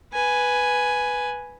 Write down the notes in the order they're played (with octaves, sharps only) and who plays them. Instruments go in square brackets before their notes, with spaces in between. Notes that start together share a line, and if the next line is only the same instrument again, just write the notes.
[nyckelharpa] B4 G#5